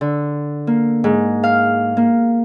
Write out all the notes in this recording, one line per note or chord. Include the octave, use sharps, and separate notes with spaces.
D3
A#3
G#2
F5
A#3